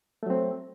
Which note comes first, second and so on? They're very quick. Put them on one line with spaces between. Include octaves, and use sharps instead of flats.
A3 F#3 C4